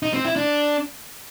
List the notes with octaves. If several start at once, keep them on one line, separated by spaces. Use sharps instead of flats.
D#4
C4
E4
D4